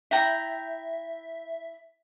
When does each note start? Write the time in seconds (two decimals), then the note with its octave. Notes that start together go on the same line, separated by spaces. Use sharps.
0.11 E4 E5 G5 A#5